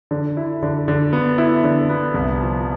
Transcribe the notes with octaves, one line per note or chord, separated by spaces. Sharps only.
D3
E4
D3
D3
B3
E4
D3
B3
C2
F3